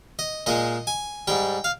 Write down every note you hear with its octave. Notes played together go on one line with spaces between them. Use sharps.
D#5
A#2 G#3 D#5
G#5
G#2 G3 G5
F5